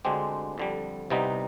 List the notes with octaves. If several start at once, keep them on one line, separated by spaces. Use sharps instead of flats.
D2 D3 G#3 C4 G4
F2 D3 G3
C2 C3 G3 B3 D#4